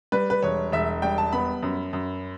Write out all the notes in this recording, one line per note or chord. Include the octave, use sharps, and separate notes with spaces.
G3 B4
B4
E1 C#5
E1 E5
G3 G5
A5
B3 B5
F#2
F#2